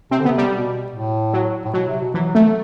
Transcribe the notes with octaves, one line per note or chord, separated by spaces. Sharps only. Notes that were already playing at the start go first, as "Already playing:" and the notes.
C3 C4
D3
C3 B3
G3
B2
A2
F#3
A2
B2 F#3
C3
B2
E3 F#3
A3